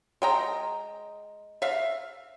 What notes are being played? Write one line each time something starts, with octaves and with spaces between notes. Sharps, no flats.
G#3 G5 A#5
E5 F5